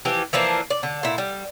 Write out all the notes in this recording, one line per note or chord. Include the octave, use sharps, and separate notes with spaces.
E3 F3 G4
E3 F3 A#3 D4
D5
D3
A#2 E4
G3